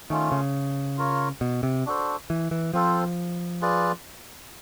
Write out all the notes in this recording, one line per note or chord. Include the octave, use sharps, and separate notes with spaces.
D#3 A3 C#4 F4
C#3
F4 A#4 C#5
B2
C3
D4 F#4 A4 C5
E3
E3
F3 C4 F4 A4 C5
F4 G#4 B4 D5